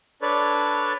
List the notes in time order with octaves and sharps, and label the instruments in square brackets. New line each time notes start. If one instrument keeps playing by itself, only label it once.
[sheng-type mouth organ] D4 A4 B4 C#5 D5